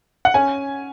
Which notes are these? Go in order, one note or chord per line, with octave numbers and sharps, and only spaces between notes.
F#5
C#4 G#5